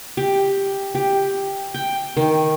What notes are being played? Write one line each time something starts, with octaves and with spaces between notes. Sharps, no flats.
G4
G4
G5
D#3